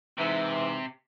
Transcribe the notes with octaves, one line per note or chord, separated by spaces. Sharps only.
G#2 C3 E3